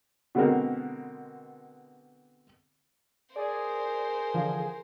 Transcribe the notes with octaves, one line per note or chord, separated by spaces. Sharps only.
B2 D3 G#3 B3 C4 A#4
G#4 A#4 C5 D5
D3 E3 F3